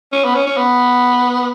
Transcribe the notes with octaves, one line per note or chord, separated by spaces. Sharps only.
C#4
B3
C#4
C#4
B3